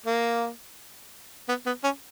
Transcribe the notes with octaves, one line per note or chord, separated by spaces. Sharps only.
A#3
B3
B3
C#4